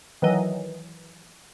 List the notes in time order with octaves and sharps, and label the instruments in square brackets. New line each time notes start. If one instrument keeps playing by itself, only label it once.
[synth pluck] D#3 E3 F#3 D#5